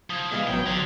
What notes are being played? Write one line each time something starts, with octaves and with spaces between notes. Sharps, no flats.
F3 D#6 G#6
B2 E3 G#3 F5
A1 F#3 B3 G5
D3 F#3 C6 G#6 B6